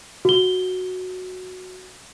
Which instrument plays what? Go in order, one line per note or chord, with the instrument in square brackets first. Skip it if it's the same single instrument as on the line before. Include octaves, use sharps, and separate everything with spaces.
[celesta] F#4 G7